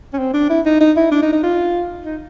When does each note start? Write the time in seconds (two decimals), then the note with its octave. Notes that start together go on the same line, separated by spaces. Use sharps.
0.13 C#4
0.19 C4
0.34 D4
0.49 E4
0.65 D#4
0.80 D#4
0.96 E4
1.11 D4
1.22 D#4
1.32 D#4
1.43 F4
2.05 D#4